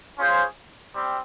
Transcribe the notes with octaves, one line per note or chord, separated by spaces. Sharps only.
C#4 F4 G#4 C5 F5
G3 C4